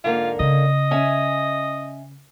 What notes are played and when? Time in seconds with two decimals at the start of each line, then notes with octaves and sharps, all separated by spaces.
0.04 G#2 D3 A#3 F4
0.40 C#3 D#5
0.91 C#4 E5 G#5